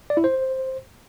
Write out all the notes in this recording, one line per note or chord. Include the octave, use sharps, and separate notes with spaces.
D5
E4
C5